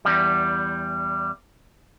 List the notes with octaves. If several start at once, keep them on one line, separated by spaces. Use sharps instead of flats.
E2 G3